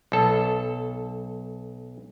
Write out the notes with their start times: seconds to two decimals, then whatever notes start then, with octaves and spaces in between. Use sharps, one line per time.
0.12 B1 A4